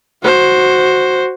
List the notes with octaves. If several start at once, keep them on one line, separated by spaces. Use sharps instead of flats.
F#4 C5